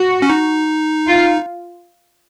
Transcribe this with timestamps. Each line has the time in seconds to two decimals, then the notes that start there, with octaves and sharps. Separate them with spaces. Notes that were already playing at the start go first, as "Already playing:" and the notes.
Already playing: F#4
0.22 C#4
0.30 D#4
1.07 F4